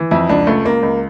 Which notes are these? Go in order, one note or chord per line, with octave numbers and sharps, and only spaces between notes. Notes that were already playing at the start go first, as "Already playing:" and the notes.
Already playing: E3
F2 E4
C#2 D4
C#2 A3
C#2 A#3
C#2